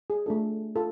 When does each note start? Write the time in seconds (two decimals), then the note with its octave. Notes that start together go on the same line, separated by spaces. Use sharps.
0.10 G#4
0.26 A3 D4 F4 A4
0.76 F4 A4